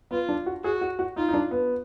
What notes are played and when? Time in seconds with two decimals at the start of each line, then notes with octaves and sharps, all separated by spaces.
0.11 B3 F4
0.29 D4
0.46 F#4
0.64 F#4 G#4
0.81 F#4
0.99 F#4
1.16 D#4 F4
1.28 D#4
1.34 D4
1.51 B3